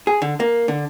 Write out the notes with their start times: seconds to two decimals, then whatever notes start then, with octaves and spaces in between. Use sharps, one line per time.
0.07 G#4
0.22 D3
0.40 A#3
0.68 D3